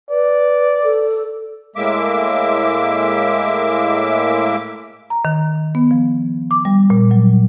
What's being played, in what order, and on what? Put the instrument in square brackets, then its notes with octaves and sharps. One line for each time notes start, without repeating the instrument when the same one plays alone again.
[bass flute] B4 [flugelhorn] D5
[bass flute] A4
[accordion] A2 G#3 A#3 E5 D6
[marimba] A#5
D#3
B3
F3
D6
G3
A#2
F#3